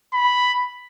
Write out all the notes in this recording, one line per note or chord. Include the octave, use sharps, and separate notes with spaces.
B5